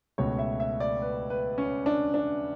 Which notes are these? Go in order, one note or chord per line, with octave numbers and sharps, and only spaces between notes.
C#2 B2 A3 C#5
E5
E5
D5
B4
B4
C#4
D4
D4